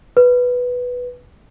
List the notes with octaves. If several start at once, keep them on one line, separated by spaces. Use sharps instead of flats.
B4